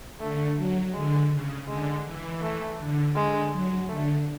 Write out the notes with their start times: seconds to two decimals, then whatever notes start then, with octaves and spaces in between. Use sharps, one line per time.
0.20 D3 A3
0.56 F#3
0.94 D3 G#3
1.30 C#3
1.68 D3 G#3
2.05 E3
2.41 A3
2.79 D3
3.15 D3 G#3
3.52 F#3
3.89 D3 A3